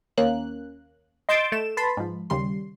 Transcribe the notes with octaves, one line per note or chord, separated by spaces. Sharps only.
D#2 A#3 C#4 F#6
D#5 C6 E6 G6 A6 D7
A3 E7
B4 A5 B5 C6
G#2 F3
D#2 C#3 G3 C6